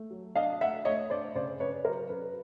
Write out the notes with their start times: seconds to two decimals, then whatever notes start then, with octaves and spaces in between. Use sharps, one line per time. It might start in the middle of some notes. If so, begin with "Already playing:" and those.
Already playing: A3
0.11 F#3
0.35 D4 D#5 F5
0.61 A3 E5 F#5
0.85 A3 C#5 D#5
1.10 D4 C5 D5
1.35 C#3 C5 D5
1.60 C#3 B4 C#5
1.84 F#3 A#4 C5
2.09 C#3 B4